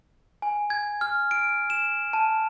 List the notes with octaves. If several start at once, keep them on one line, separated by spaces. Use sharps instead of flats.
G#5
G#6
F6
D7
E7
A5